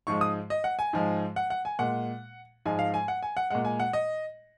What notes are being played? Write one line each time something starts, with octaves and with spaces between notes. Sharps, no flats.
G#2 F3 G#3 C#6
D#6
D#5
F#5
G#5
G#2 F3 G#3
F#5
F#5
G#5
A#2 G#3 F#5
G#2 F3 G#3 G#5
F5
G#5
F#5
G#5
F#5
A#2 G#3 F#5
G#5
F#5
D#5